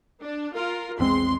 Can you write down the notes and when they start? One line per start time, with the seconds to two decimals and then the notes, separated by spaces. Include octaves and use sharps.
0.20 D4
0.53 F4 A#4
0.99 A#1 E2 G#3 C4 C6